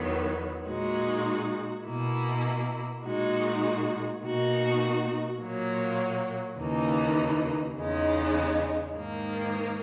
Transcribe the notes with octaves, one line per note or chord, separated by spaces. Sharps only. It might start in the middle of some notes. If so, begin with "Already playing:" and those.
Already playing: E2 D#3 F#3 B3
A#2 G#3 D#4 F#4
B2 A#3 E4
A#2 G#3 D#4 F#4
B2 A#3 D#4 F#4
A#2 F#3 A#3
D#2 C#3 E3 A#3 D#4
E2 C#3 G#3 D#4
G#2 D#3 A#3